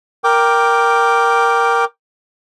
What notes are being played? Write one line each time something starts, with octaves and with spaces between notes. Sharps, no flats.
A#4 G5 D6